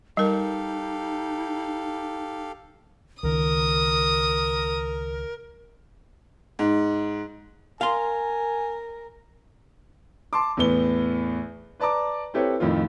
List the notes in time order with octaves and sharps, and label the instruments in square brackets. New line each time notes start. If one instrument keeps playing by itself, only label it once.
[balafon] G3 A#4 [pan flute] D#4 [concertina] G4 A4 F5
[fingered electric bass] C#2 D#3 [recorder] A#4 [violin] D#6
[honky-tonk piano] G#2
[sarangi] A#4 [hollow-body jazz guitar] F5 C6 [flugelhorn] G#5
[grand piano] A5 C6 D6
E2 A2 B3 G7
B4 D5 A5 A#5 D6
C4 E4 G4 A4 B4 C#5
F2 A2 D#3 F4